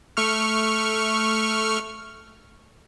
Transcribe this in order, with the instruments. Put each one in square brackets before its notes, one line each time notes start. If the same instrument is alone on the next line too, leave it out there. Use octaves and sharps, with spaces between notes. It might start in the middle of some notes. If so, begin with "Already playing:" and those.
[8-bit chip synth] A3 C#6 F6